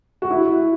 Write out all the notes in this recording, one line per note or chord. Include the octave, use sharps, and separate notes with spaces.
F#4
E4